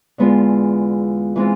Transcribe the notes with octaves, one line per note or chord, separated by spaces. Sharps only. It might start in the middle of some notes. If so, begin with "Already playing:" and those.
E2 D3 G#3 B3 F4
E3 G#3 C4 F4